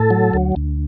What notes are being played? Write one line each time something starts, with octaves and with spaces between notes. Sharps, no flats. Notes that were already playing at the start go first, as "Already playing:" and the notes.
Already playing: A2 A4
F#3
D2
D2